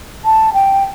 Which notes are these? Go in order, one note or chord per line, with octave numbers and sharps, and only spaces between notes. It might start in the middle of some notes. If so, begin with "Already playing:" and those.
A5
G5